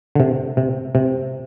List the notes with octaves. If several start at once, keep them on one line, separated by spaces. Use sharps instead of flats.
D3
C3
C3
C3